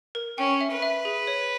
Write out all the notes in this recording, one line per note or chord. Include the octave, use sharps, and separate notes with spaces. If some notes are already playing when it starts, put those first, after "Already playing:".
A#4
C#4 G5
E5
B4
E5
G#4
C#5